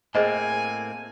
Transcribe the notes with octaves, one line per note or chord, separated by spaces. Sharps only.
A2 A#3 C4 G#4 C5 D#5 G#5